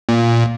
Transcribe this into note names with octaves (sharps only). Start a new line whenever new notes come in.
A#2